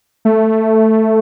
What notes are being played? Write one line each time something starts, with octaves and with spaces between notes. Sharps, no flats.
A3